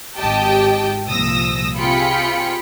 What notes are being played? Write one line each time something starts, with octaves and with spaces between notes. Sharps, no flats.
G#1 G4 D#5 G5 A5
C2 A#2 F3 D#6 E6 A#6
C3 F4 G#4 G5 B5 C#7